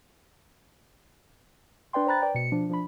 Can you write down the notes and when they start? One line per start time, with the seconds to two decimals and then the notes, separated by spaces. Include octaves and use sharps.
1.93 D4 B4 D5 G5 C6
2.07 C5 G5 A#5 B5 F#6 A6
2.22 B4 D5 G5
2.35 B2 C#7
2.52 F3 D4
2.70 F3 D4 B5